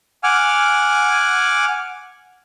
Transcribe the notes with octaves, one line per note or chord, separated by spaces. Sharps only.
F#5 G#5 D6 F6